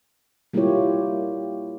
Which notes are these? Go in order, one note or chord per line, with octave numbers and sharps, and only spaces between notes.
G3 A#3 E4 F4 G4 C#5